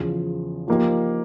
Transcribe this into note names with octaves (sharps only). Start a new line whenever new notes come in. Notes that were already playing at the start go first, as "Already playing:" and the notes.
Already playing: E2 C#3 F3
F3 A#3 D#4 G4